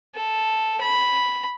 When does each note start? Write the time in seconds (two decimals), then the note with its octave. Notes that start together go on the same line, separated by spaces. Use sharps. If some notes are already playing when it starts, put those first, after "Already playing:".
0.15 A4
0.81 B5